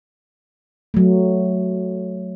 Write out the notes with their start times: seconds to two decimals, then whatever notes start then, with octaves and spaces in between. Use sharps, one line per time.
0.94 F#3 A3